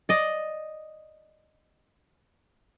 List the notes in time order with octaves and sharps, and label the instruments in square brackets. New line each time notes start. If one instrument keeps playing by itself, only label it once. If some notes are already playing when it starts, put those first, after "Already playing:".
[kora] D5 D#5